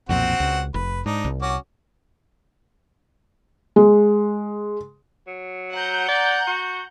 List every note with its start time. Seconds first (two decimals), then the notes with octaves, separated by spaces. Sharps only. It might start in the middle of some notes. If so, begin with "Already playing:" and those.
0.09 B1 F2 A#2 C4 F#4 F#5
0.40 C#2
0.74 F1 B4
1.06 G#2 D4 D#4
1.25 C2
1.42 C#4 F#4 D6
3.76 G#3
5.27 F#3
5.73 F#5 A#5 G6
6.08 D5
6.47 F#4